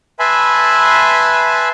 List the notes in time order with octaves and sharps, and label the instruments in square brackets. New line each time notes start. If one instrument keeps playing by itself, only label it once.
[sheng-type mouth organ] B4 E5 G#5 A5 B5 C6